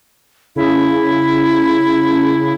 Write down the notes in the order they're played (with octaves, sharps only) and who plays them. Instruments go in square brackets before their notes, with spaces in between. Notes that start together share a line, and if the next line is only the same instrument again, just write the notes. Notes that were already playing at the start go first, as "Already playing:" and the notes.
[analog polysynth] C#3 [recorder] E4